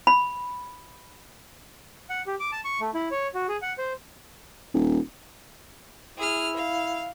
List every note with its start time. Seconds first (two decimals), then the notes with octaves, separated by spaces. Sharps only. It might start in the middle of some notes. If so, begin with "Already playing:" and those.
0.07 B5
2.10 F#5
2.27 G4
2.40 D6
2.52 A5
2.64 C#6
2.80 A3
2.94 E4
3.11 C#5
3.34 F#4
3.49 G#4
3.62 F#5
3.78 C5
4.74 D#1
6.17 E4 G#4 F6
6.56 F5